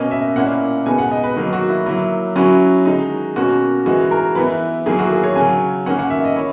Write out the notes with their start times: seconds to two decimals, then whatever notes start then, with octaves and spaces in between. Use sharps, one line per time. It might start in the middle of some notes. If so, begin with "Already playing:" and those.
Already playing: B2 A#3 C#4 D#5
0.11 E5
0.36 A#2 A#3 C#4 E4 F#5
0.86 B2 G#3 B3 D#4 G#5
0.98 F#5
1.11 D#5
1.24 B4
1.36 D#3 F#3 A#3
1.53 F#4
1.69 E4
1.86 F#3 A#3 E4
2.36 F#3 C#4 E4 F#4
2.85 D#3 G#3 D#4
3.36 B2 A#3 C#4 F#4
3.86 E3 G#3 D#4 F#4
4.11 A#4
4.35 E3 B3 E4 B4
4.86 D#3 F#3 A#3 E4 G#4
4.99 F#4
5.10 G#4
5.24 C#5
5.36 C#3 F#3 C#4 G#5
5.86 D#3 A#3 C#4 F#5
5.99 F#5
6.10 E5
6.24 D#5
6.36 E4 C#5